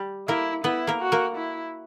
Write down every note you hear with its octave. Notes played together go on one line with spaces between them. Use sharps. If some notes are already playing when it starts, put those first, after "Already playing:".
Already playing: G3 G4
A#3 E4 A#4
B3 E4 B4
A#3 A#4
F#4
A#3 A#4
E4